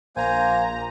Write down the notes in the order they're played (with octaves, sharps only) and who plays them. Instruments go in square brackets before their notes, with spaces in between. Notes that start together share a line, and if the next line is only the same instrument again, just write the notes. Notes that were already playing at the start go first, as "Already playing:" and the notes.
[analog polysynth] A#1 A#5 [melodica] A#3 C5 G#5